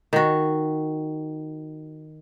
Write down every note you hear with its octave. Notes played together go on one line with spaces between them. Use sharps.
D#3 F#4